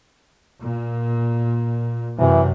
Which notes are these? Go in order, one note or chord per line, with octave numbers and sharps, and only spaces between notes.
A#2
F#2 C3 E3